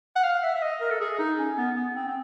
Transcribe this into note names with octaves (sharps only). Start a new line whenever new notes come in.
F#5
F5
E5
E5
D#5
A#4
A4
G#4
D#4
C#4
B3
B3
C4
C4